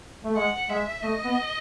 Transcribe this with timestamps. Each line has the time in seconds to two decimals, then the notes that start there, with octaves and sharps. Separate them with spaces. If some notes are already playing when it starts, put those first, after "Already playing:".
0.24 A3
0.36 G#3 F#5
0.69 G#3 E5
1.03 A3 D#5
1.25 B3